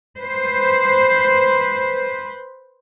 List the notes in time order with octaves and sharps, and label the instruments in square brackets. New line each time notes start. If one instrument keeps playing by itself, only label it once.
[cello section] B4 C5